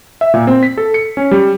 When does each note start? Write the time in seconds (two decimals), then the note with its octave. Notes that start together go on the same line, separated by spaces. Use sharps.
0.21 E5
0.34 A#2
0.47 C4
0.63 B6
0.77 A4
0.94 C#7
1.17 C#4
1.31 G3